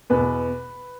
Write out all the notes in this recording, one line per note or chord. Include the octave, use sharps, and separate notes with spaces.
E2 B2 B4